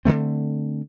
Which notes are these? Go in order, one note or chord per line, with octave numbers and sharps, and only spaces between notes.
D3 F3 A3 C4